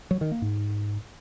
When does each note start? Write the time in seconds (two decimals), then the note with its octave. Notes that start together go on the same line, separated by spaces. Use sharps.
0.11 F#3
0.21 D#3
0.31 A#3
0.42 G#2